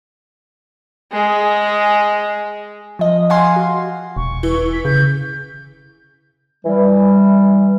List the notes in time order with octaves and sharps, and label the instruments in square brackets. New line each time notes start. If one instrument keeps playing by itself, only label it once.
[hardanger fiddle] G#3 G#4
[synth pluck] F3 D#5
F5 F#5 G#5 C6
F#4
[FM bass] E1 [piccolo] C#6
[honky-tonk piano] E3
[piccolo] B6
[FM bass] C#3 [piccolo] G6
[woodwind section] E3 G3